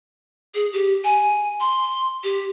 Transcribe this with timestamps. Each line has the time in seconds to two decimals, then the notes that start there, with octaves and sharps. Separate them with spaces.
0.55 G#4
0.73 G4
1.04 G#5
1.60 C6
2.24 G4